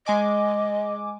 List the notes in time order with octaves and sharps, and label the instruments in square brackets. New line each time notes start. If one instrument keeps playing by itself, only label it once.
[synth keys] G#3 G#5 D6 [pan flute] D#5